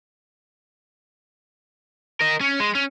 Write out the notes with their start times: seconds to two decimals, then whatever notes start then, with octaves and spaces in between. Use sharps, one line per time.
2.21 A#4 D#5
2.41 C#4
2.60 G#3
2.75 C#4